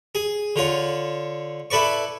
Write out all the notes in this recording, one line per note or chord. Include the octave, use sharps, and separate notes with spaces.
G#4
D3 F4 C#5
E4 A4 B4 D5 C#6